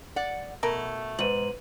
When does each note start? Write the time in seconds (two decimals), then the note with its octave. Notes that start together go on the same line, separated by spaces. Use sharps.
0.16 D5 F#5
0.63 B2 A3 A#4
1.19 G#2 B4 D#7 F#7